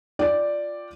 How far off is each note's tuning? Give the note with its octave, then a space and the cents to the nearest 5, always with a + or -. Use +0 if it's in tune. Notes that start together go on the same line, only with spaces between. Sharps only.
F4 +0 D5 +0 G5 +0